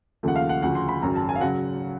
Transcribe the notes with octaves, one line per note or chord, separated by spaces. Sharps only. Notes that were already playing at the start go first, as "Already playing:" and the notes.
D#2 C#3 F3 A3 F#5
F5
F#5
D2 C#3 F3 F#5
C6
B5
G#1 F#2 C#3 A#5
A5
G#5
F5
C#3 F#3 F#5